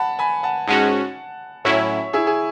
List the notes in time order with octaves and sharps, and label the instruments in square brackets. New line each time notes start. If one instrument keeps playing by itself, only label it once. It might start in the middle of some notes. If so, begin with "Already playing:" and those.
Already playing: [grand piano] F#5 A5 B5
G#5 B5
F#5 A5
[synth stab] G#2 G#3 C#4 F#4 [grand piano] F#5 A5
[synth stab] A2 F#3 C#4 E4 [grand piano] C#5 E5
[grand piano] E4 G#4
G#4